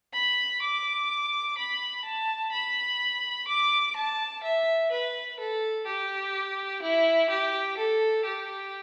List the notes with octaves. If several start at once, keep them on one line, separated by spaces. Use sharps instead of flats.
B5
D6
B5
A5
B5
D6
A5
E5
B4
A4
G4
E4
G4
A4
G4